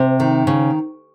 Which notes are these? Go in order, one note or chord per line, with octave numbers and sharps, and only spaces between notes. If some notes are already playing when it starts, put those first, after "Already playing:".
Already playing: C3
D#3
C#3